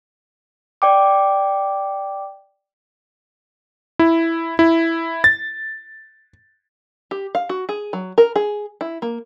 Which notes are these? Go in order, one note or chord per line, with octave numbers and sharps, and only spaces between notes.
D5 G5 D6
E4
E4
A6
G4
F5
F#4
G#4
F#3
A#4
G#4
E4
A#3